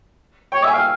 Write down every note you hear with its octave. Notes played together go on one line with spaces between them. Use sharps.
C#5 G5
E5 G#5
F5 G5